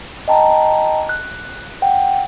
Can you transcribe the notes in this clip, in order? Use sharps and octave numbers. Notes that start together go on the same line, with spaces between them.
D#5 G5 A5 A#5
F#6
F#5 G5